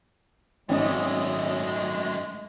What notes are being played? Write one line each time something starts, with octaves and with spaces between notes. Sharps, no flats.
G#1 F#2 G#3 A3 C#4 D#5